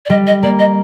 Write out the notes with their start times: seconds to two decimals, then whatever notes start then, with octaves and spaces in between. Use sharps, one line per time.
0.06 D5
0.10 G3 D#5
0.27 D#5
0.43 A#3 D5
0.59 D#5